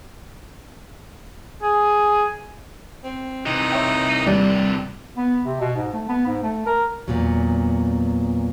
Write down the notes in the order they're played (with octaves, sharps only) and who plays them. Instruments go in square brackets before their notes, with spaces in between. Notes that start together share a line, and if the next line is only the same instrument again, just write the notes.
[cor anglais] G#4
[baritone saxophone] C4
[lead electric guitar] C3 E3 [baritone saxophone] D#4
[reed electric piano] C#5 E5 G5
[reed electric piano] D#2 G3 [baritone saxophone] D4
[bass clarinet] B3
C3
B2
G#2
A3
B3
G#2
A3
A#4
[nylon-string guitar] E2 A#2 F#3